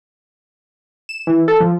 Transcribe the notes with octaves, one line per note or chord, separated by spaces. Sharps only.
E7
E3
A4
F3